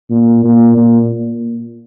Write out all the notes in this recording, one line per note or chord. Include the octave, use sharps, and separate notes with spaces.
A#2
A#2
A#2